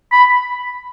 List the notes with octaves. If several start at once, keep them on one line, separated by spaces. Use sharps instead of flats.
B5